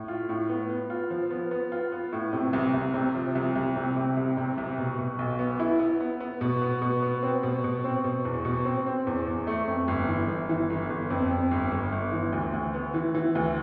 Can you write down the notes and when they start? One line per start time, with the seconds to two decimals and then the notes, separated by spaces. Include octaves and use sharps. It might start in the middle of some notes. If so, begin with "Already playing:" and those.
Already playing: A2
0.08 F4
0.29 A2
0.49 B3
0.70 B3
0.90 F4
1.10 F3
1.31 B3
1.51 B3
1.72 F4
1.92 B3
2.12 A2
2.33 C3
2.53 C2
2.74 C2
2.94 C3
3.15 F3
3.35 C2
3.55 C2
3.76 C3
3.96 C3
4.17 C2
4.37 C3
4.58 C2
4.78 B2
4.99 B2
5.19 B1
5.39 B3
5.60 E4
5.79 B3
6.00 B3
6.20 B3
6.41 B2
6.62 B3
6.82 B2
7.02 B3
7.23 C4
7.43 B2
7.64 B2
7.84 C4
8.04 B2
8.25 E2
8.45 B2
8.65 C4
8.86 C4
9.07 E2
9.27 E2
9.47 A3
9.67 F2
9.88 G1
10.08 E3
10.28 G1
10.49 E3
10.70 G1
10.90 G1
11.10 F2
11.31 F2
11.51 G1
11.72 G1
11.92 G1
12.12 E3
12.32 D2
12.53 D2
12.74 B3
12.94 E3
13.14 E3
13.35 D2